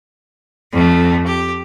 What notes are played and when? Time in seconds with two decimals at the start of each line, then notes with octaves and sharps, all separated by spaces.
0.72 F2 A3
1.25 G4